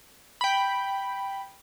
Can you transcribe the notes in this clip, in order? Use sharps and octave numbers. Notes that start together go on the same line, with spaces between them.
G5 B5